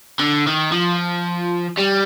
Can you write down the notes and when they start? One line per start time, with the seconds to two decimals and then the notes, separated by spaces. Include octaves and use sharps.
0.20 D3
0.48 D#3
0.72 F3
1.77 G3